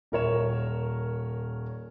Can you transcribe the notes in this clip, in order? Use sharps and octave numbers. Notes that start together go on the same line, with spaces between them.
D#1 A#4 C#5 E7